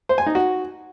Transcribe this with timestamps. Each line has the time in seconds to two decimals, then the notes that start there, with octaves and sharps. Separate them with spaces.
0.09 C5
0.18 G#5
0.26 D#4
0.35 F#4